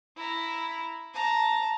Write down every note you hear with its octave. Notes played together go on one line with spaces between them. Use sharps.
E4 A#5
A5 A#5